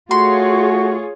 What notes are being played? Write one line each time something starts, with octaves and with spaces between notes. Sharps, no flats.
A3 F4 F#4 G#4 C#5 C6